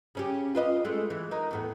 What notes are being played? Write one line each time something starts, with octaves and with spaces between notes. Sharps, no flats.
C#3 C#4 G4
F4 B4 D#5
G#3 A3
E3
D#4 A#4
E2 A2 B3